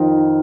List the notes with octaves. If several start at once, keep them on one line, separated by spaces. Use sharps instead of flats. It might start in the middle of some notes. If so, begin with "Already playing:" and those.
Already playing: F2 D#3